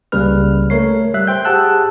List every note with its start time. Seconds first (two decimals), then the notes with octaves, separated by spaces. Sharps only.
0.12 C#2 C#3 G3 A#3 B4 F6
0.70 A3 A#4 C#5 C7
1.14 G3 E5 F#6
1.27 C5 G5 G6
1.45 G4 G#4 F#5 A5 E6 F#6